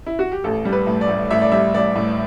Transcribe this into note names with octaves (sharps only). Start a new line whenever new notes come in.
E4
F#4
G4
A1 A4
G3
B4
A2
D5
A1
A1 E5
D5
G3 E5
A1 D5
A2